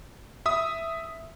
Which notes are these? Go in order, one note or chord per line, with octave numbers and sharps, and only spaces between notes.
E5 D#6